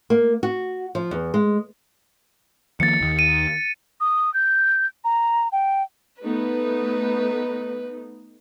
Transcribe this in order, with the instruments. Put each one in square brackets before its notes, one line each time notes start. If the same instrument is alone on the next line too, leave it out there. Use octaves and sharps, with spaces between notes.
[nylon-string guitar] A#3
F#4
F3
E2
G#3
[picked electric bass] D#3 F3 A#3 [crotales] A6 C#7
[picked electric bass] D#2 D#3
[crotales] D#7
[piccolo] D#6
G6
A#5
G5
[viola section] A3 B3 D#4 [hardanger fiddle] B4